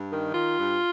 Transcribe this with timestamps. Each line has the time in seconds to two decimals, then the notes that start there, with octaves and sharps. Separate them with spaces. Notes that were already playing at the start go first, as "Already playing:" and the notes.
Already playing: G2
0.12 D#3
0.34 D#3 F4
0.59 G2